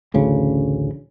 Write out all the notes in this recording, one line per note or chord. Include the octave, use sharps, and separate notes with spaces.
A1 D2 C#3